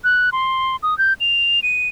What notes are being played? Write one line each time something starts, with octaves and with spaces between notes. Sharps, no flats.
F#6
C6
D#6
G6
F7
D#7